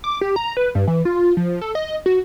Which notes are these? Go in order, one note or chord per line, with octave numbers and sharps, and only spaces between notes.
D6
G4
A#5
B4
G2
E3
F4
F3
A4
D#5
F#4